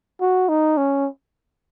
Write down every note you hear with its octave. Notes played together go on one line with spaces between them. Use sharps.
F#4
D#4
C#4